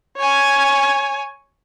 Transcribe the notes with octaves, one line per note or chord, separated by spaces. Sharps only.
C#5 G#5